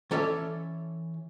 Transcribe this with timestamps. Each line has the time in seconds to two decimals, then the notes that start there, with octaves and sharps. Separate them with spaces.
0.11 E3 C#4 A4 C#5 D5 E5